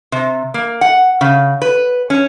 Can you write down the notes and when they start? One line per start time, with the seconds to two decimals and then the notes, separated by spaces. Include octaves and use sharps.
0.12 C3
0.54 A#3
0.81 F#5
1.21 C#3
1.62 B4
2.10 C#4